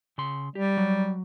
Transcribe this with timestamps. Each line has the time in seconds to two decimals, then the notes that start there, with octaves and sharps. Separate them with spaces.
0.18 C#3 C6
0.55 G3 G4
0.77 F#3